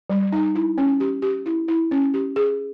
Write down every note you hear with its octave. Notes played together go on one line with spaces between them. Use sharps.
G3
D#4
E4
C#4
G4
G4
E4
E4
C#4
G4
G#4